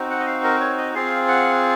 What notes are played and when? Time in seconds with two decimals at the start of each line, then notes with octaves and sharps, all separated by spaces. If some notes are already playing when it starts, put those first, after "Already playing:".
Already playing: C4 D#4 F#4
0.10 F#5
0.20 D#5
0.27 F5
0.44 A#4
0.60 C#5
0.78 D#5
0.94 C4 F4 G#4 F5
1.28 F#5